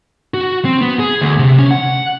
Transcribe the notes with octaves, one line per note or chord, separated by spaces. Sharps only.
F#4
C4
B3
G#4
D2
C3
C#4
F#5